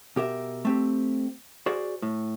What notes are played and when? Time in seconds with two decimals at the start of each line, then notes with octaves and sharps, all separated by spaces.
0.16 B2 G4 A#4 E5
0.65 A3 C4 G4
1.66 F#4 G#4 C5 D5
2.02 A2